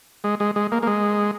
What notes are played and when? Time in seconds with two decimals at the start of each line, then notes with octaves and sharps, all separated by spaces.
0.24 G#3
0.40 G#3
0.56 G#3
0.72 A#3
0.83 A#3
0.87 G#3